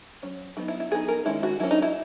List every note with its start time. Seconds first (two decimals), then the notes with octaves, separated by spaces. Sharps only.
0.23 F#3 C#4
0.57 F#3 B3 D#4 E4
0.68 E4
0.80 E4
0.91 F#3 B3 D#4 G#4
1.08 A#4
1.25 D#3 G#3 C#4 E4
1.43 F#4
1.60 F#3 A#3 C#4 E4
1.71 D#4
1.82 E4